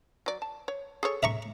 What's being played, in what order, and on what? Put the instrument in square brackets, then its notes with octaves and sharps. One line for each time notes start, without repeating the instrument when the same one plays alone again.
[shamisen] F#3 D5
A5
C#5
G#4 A4 C#5
[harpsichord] E5 A#5 C#6